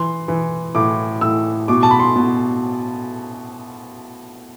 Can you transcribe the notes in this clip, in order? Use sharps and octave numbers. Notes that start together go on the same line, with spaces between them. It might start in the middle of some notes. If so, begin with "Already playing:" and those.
Already playing: E3 C6
E3
A2 D6
A2 E6
B2 D6
A5
B5
C6
B2